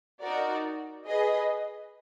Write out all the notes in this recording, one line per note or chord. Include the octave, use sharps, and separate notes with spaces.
D#4 F#4 A#4 D5
G#4 B4 D#5